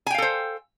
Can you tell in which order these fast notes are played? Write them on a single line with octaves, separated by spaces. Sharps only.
G#5 G5 F5 A4 C5